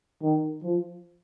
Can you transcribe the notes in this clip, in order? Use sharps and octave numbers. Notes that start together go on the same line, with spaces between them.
D#3
F3